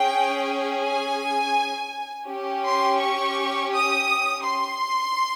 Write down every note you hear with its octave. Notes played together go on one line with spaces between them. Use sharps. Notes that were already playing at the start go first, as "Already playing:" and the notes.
Already playing: C#4 G#4 G5
G#5
C#4 G4
C6
C#6
D#6
C6